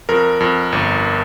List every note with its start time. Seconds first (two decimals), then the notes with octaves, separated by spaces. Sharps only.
0.09 F2 A#4
0.40 F2
0.72 G1